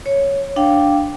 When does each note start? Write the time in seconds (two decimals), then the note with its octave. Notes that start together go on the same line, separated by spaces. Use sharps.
0.06 C#5
0.56 D4 F5 G5